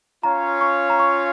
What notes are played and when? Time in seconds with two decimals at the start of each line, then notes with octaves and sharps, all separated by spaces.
0.23 C#4 F4 C#5 F5 A#5
0.61 C#6
0.90 A#5
0.99 C#6